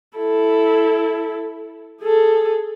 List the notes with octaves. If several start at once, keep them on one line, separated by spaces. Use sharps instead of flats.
E4 A4
G#4 A4